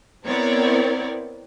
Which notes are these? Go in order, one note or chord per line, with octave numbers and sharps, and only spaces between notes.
B3 C4 E4 A#4 C#5 D5